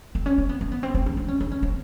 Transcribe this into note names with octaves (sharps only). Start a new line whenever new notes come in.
C4
C#4
C4
B3
C4
B3
C4
C4
C#4
D4
C#4
D4
C#4
C4